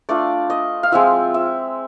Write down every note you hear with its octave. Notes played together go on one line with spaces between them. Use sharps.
A3 D4 F4 D5
D#5
F5
F3 G#3 C4 F4 E5
E5